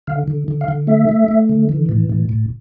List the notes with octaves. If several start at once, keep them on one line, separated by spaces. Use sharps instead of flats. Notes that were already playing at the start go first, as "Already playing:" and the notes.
D3 F5
D3
D3
F5
D3
A3 E5
A3
A3
D3
E3
A2
A2
A2